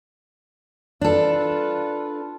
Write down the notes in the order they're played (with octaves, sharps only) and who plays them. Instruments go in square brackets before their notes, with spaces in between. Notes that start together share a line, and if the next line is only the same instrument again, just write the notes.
[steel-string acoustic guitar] D4 A4 [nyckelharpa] F4 B4